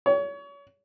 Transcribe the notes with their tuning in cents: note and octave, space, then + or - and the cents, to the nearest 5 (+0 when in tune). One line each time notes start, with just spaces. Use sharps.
C#5 +35